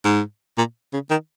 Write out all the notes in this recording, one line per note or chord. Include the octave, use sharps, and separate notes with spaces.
G#2
A#2
C#3
D#3